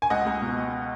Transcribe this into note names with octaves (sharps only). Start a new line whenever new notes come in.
G#5
C#2 D#5 F#5
C#2
B2